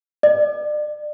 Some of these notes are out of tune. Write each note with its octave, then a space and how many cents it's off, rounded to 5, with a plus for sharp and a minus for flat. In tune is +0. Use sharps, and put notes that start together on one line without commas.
D5 +35